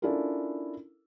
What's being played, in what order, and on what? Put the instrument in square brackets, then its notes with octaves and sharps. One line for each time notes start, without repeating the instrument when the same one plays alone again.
[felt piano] C#4 D4 E4 F4 A4 A#4